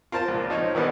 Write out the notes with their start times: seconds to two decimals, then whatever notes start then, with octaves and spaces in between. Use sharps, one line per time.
0.12 F4 A#4 C5 A5
0.28 C#2 A#2
0.50 F3 D#4 C5 C#5
0.75 D#3 E3 G3 B3 D#4 E4